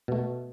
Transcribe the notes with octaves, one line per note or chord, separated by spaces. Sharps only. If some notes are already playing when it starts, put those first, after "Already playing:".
B2 A3